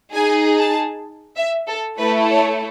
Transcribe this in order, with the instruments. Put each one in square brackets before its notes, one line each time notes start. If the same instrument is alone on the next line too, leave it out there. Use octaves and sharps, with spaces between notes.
[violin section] D#4 G#4 G#5
A5
E5
A4
A3 E4 A4 B4
C#5